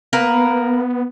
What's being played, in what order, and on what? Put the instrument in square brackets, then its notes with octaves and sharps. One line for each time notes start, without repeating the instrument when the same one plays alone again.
[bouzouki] A#3 A#4 B4 [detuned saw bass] B3